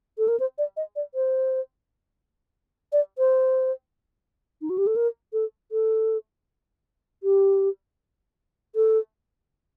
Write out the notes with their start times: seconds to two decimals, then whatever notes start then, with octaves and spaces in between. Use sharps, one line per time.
0.18 A4
0.28 A#4
0.40 C5
0.58 D5
0.77 D#5
0.96 D5
1.14 C5
2.92 D5
3.18 C5
4.61 D#4
4.70 F#4
4.78 G4
4.87 A4
4.96 A#4
5.33 A4
5.72 A4
7.23 G4
8.75 A4